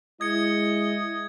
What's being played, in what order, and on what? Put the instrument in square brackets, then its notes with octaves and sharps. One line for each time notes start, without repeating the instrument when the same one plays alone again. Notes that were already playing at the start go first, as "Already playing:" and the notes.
[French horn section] G#3 E4 [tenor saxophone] D#5 [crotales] G#6 C#7